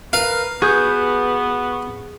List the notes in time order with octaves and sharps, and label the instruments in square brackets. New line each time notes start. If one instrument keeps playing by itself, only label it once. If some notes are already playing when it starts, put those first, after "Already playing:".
[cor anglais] A#4 [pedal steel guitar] B4 [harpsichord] F5
[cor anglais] B3 [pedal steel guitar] F#4 B4 G6 [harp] G#4